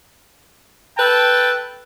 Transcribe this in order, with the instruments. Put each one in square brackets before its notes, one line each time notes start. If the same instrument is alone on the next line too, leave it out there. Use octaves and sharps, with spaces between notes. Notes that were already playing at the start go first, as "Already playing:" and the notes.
[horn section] A4 B4 G5 A5